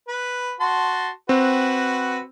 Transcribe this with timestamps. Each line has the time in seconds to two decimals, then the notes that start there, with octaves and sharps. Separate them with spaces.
0.08 B4
0.60 F#4 A5 C6
1.29 C4 F#4 B4